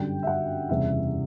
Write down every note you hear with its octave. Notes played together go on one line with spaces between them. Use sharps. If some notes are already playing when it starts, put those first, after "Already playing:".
Already playing: G1 F#2 D3 G3 G5
E5
F#5
F#1 E2 C3 E3 G3 E5